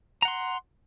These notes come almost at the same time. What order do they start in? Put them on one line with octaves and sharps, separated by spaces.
A#5 F#5 C6